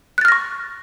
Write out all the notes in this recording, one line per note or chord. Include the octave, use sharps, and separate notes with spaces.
C#6 F6 F#6 A6 A#6